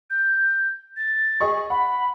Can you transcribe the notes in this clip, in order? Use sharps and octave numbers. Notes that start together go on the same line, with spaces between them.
G6
A6
G#4 D#5 C#6
F#5 B5